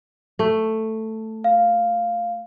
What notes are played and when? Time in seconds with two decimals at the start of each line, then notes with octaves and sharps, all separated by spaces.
0.39 A3
1.44 F5